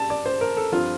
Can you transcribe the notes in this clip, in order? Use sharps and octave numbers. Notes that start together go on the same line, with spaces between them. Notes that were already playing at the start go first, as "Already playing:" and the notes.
Already playing: G3 A5
D5
C5
A#4
A4
G2 F3 C4 F4